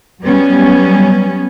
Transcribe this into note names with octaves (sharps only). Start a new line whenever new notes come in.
F#3 G3 B3 C#4